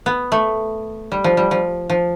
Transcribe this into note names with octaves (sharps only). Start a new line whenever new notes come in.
B3
A3
G3
F3
G3
F3
F3